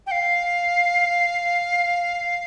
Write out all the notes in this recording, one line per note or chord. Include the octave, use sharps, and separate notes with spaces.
G5
F5